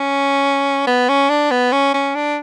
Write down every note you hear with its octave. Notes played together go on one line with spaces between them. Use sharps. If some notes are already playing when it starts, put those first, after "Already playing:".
Already playing: C#4
B3
C#4
D4
B3
C#4
C#4
D4